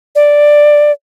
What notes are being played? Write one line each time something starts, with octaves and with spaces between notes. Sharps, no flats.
D5